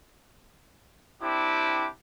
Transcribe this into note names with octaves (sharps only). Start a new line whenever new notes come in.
C4 D4 E4 G4 D6